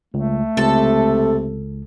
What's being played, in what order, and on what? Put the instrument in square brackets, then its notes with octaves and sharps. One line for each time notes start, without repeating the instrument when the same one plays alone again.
[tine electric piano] C#2 [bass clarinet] A3
[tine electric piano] C#2 [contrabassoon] C3 [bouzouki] A4